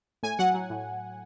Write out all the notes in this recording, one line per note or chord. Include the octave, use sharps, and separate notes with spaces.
A2 G#5
F#3 F#5
F#3
A2